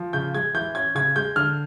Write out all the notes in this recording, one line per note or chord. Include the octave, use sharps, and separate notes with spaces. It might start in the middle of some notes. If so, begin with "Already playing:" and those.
Already playing: F3
C#3 G6
G#3 G#6
E3 G6
C#4 G#6
C#3 G#6
G#3 G6
D3 F6